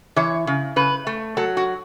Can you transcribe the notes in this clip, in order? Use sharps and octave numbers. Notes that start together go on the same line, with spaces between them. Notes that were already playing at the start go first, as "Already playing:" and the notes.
E3 C#5
C#3
C#3 B4
A3
F#3 A4
F#4